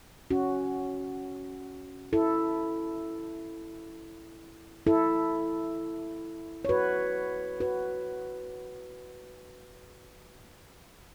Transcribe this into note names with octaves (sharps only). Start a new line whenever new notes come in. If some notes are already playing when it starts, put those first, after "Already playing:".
C#4 F#4
E4 A4
E4 A4
C#5
F#4 B4
F#4 B4